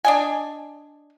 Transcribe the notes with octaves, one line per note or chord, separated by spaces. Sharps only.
D4 D#5 G#5